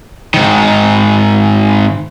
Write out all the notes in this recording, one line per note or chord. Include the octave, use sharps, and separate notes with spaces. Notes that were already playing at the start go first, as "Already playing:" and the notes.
G#2 D#3